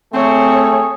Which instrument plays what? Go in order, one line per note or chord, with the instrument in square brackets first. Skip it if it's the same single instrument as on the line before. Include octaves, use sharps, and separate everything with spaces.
[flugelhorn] A3 [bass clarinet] C4 [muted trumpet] G#4 [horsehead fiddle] C#5